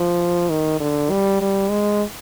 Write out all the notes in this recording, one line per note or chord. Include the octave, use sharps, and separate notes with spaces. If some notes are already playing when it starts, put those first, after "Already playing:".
Already playing: F3
D#3
D3
G3
G3
G#3